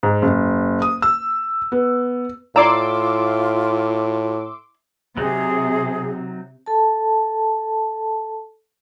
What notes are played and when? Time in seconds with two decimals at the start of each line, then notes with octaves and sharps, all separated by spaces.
0.03 G#2
0.22 F#1
0.82 D#6
1.02 E6
1.72 B3
2.56 A2 E4 F4 D5 A#5 C6 D6 E6
5.17 C3 F#3 C4 D#4 G#4
6.66 A4 A5